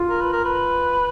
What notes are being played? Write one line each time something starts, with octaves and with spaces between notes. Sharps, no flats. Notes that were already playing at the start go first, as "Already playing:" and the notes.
Already playing: F4
A#4
B4
A#4
B4